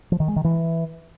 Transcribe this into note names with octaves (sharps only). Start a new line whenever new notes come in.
F3
D#3
G#3
D#3
E3